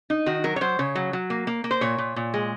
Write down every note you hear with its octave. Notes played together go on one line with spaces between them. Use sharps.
D#4
D#3 F#4
F#3 A#4
C#5
F#3 C5
C#3 C#5
F#3
F#3
A#3
A#3
A#3
C5
A#2 C#5
A#2
A#2
G#3